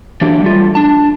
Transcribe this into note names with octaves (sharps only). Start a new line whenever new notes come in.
E3 F#3 A#3 D4 G4
G3 A3 F4
D4 A5